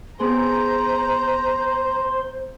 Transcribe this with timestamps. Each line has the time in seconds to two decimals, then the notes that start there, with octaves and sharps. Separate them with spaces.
0.19 B3 C4 G#4 C5 A#5 C6